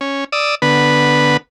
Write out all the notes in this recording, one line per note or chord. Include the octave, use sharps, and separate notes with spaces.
C#4
D5 D#6 E6
D3 B3 B4